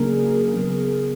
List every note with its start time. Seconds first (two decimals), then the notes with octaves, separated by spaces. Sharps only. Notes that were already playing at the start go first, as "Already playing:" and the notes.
Already playing: C#3 F#3 A#3 D4 G#4 A#4
0.54 C#3 F#3 B3